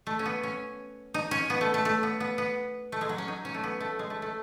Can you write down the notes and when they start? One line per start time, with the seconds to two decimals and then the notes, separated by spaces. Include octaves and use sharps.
0.07 A3
0.19 C#4
0.26 B3
0.43 C#4
1.14 D#4
1.31 C#4
1.50 B3
1.61 A3
1.74 A3
1.85 A3
2.03 B3
2.20 B3
2.38 B3
2.92 A3
3.01 G#3
3.09 F#3
3.18 C#4
3.28 D#4
3.45 C#4
3.54 A3
3.64 B3
3.80 A3
3.99 G#3
4.10 A3
4.22 A3